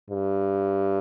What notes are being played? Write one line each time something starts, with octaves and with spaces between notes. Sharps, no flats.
G2